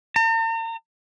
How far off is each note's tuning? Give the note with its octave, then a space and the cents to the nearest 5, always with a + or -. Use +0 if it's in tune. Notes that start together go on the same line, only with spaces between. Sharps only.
A#5 -45